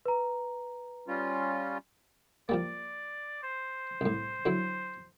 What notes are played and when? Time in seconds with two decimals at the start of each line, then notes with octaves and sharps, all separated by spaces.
0.06 B4 A#5
1.08 G3 C#4 F4
2.49 F3 G3 A#3 D5
3.43 C5
4.01 C2 A2
4.45 D3 F#3 E4